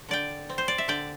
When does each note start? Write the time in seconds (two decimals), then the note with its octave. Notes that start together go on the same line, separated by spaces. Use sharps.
0.09 D3 D5 G5
0.50 C4
0.58 C5
0.68 D5
0.78 E5
0.88 D3 D5 G5